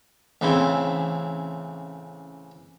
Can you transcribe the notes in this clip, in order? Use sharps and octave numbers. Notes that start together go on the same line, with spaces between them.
A1 C#3 E3 C4 E4